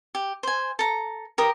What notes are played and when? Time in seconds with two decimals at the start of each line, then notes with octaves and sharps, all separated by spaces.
0.15 G4
0.43 C5 G#5
0.79 A4 A#5
1.38 G4 A#4 D#6